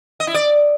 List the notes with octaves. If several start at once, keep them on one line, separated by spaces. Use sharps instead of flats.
D#5
E4
D5